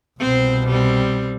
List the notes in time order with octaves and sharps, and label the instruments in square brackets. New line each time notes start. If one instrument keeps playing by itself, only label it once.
[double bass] C2 B2 [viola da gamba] C4 C5
[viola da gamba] G3 C4